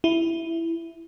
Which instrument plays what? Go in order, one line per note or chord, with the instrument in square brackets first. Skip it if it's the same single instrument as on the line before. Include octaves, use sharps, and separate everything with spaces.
[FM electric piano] E4